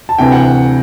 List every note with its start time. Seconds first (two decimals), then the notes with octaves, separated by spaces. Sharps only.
0.09 A5
0.18 D2 C3 E3 G5
0.32 F#5